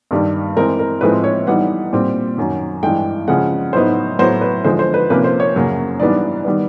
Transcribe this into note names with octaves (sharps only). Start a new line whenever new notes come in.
G2 D#3 G3
E3 G#3 C4 A#4
A#4
A2 F3 G#3 C4 B4
C#5
E3 G3 B3 D#4 F#5
A#2 G3 C4
F#2 D#3 F#3
G2 E3 G#3 G5
C#3 F3 G#3 F#5
A2 F#3 B3 D#4 C5
A2 F#3 B3 C5
B4
D3 F3 G#3 C5
C5
B4
C3 F3 A#3 C#4 B4
C5
C#5
F#2 C#3 F#3 A#3
G#2 E3 G3 B3 D4 D5
D#3 G3 B3